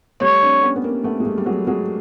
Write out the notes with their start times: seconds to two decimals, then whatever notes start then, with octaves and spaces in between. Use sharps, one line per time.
0.21 G3 A3 C#5
0.42 C4 D4
0.62 B3 C#4
0.76 B3
0.83 A#3 C4
1.04 A3 B3
1.20 G#3
1.26 G3 A3
1.38 G3
1.46 F#3 G#3
1.67 F#3 G#3